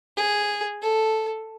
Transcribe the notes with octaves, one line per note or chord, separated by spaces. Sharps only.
G#4
A4